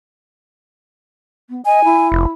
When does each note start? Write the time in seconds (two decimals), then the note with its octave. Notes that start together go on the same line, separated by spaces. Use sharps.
1.50 B3
1.65 D#5 G#5
1.84 E4
2.12 F1